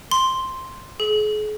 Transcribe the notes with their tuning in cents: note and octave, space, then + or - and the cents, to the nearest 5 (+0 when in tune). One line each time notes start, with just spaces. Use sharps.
C6 +0
G#4 +40